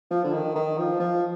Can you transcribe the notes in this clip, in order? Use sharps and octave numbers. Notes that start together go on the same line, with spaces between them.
F3
D3
D#3
D#3
F3
F3